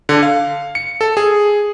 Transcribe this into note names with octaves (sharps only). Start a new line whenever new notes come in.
D3
F5
C#7
A4
G#4